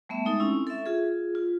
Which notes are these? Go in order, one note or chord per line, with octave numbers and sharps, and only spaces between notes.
G3 A3 B3 E5
G#3 D#4 A4
C4 C#4 E4
A4 E5
F4 G#4
F4